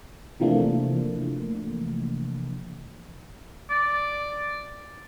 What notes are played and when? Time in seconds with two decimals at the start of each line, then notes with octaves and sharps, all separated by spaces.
0.40 C3 E3 F3 A3 A#3 D4
3.70 D5